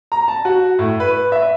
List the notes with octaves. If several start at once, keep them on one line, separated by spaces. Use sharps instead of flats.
A#5
A5
F#4
A2
B4
E5